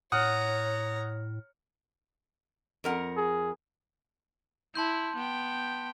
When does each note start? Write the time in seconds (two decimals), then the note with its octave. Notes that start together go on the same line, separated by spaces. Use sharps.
0.12 A2 C#5 F#5 A#5 D#6 F6
2.84 F2 A#4 F#5
3.17 G#4
4.75 E4 A5 C6 G6
5.16 B3 G5